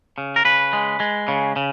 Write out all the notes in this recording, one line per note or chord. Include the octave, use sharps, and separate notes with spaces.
C#3
A#4
C#3 B4
G#3
G#3
C#3
C#3